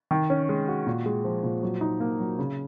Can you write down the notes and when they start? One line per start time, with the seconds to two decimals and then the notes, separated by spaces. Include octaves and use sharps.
0.11 D#3
0.30 C#4
0.49 G#3
0.68 F#4
0.86 A#2
1.06 G#3
1.24 F3
1.44 A#2
1.63 F#3
1.81 D#4
2.00 A#3
2.20 F#3
2.39 C#3